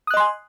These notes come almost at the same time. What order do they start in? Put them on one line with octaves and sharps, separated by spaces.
D#6 F#6 D#5 C6 G#5